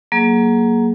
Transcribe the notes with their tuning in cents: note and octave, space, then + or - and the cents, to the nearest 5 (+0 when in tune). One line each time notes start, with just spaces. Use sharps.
F#3 +0 A#3 +0 G#4 +25